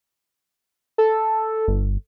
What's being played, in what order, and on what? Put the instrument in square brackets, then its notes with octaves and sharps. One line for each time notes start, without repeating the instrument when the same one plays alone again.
[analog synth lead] A4
[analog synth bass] G1